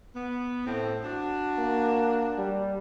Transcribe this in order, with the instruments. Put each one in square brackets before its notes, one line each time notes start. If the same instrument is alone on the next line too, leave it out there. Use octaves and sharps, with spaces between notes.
[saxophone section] B3
A2 C4
D4 F#4
[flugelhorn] A#3
G3